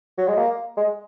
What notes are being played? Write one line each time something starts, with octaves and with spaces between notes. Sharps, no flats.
F#3
G#3
A#3
G#3